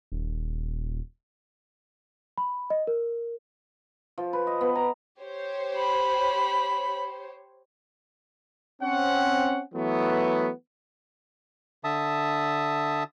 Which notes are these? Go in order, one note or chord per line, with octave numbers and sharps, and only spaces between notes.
D#1
B5
D#5
A#4
F3
B4
D#5
B3
A#5
G4 C5 C#5
B5
C4 C#4 F#5
E3 F#3 A3 B3
D3 E5 A5 D#6